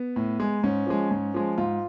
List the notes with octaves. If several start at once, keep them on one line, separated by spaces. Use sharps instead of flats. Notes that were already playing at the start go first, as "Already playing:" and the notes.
Already playing: B3
A2
G#3
G#2 C#4
F3 G#3
G#2
F3 G#3
G#2 F4